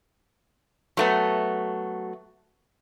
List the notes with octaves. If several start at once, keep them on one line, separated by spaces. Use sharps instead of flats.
F#3 A3 B3